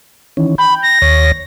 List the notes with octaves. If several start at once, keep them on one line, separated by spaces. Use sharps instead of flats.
D#3 E3 C#4
G5 B5
A#6
D#2 C#5